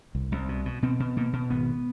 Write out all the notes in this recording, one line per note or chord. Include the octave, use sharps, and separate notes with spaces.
C2
C2
B2
B2
B2 C4
B2
B2 A#3
B2
G#1 B3